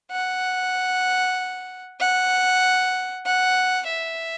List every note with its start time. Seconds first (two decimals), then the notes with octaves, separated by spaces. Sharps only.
0.12 F#5
2.00 F#5
3.26 F#5
3.88 E5